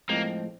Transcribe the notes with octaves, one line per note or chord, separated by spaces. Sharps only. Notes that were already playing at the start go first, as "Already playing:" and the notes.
A2 F3 G#3 A#3 C4